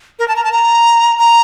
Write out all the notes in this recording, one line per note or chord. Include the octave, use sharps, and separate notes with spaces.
A#4
A5
A#5
A5
A#5
A#5